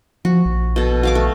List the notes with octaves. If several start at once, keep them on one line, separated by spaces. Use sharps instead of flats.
F3 F#4
A#1
B2 A4
F#4 F5 D6
A3